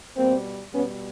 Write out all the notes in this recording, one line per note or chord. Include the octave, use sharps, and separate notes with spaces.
B2 G3 A#3 C4
B2 G3 B3 C#4